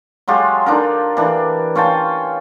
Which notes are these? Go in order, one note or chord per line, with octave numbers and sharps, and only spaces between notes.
F#3 G#3 F4 G4
D4 D#4 F4 A#4
E3 D4
C#4 F4 G5 A5